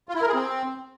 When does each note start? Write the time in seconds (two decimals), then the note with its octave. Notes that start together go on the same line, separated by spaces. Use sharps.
0.09 F4
0.15 E4
0.22 A#4
0.28 G#4
0.34 C4